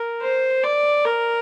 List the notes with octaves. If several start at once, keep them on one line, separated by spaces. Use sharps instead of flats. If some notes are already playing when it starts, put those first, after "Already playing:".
Already playing: A#4
C5
D5
A#4